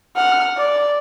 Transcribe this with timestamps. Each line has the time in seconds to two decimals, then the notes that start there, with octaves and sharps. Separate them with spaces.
0.16 F#5 F6
0.57 D5